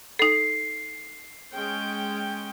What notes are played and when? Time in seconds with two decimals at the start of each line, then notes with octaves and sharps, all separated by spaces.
0.19 D#4 A4 C7
1.53 G#3 C#4 G5